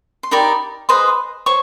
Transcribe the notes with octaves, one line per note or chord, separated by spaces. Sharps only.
C6
D#4 G4 A#4 D5 B5
G#4 B4 C5 D#5 C6
C5 C#5 C#6